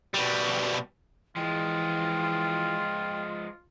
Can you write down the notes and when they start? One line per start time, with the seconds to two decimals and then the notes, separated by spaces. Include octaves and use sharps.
0.14 B2 G3
1.36 E3 F3 G#3 F4 G5